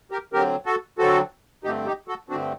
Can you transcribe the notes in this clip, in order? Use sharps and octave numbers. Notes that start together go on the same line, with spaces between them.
G4 A#4
D3 F#3 C4 G4 A#4
F#4 A4
D3 F#3 C4 F#4 A4
G2 D3 A3 C4 D#4 G4
D#4 G4
F#4 A4
G2 D3 A3 C4 D4 F#4